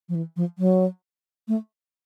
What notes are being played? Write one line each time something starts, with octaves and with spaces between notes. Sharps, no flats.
F3
E3
F3
F#3
A3